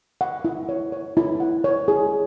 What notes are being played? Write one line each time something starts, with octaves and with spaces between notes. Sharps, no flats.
F#5
E4
C#5
C#5
E4
F#5
C#5
G#4